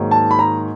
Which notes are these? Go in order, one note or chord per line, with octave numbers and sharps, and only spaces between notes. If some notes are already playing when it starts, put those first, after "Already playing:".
Already playing: G#2 D#3 F#3 A#3
A5
B5
A#5